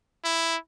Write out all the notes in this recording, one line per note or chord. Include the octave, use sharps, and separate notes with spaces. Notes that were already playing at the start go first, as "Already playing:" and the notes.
E4